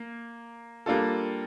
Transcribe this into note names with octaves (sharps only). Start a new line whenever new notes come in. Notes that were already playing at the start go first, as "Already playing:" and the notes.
Already playing: A#3
G3 A#3 D4 F4 A4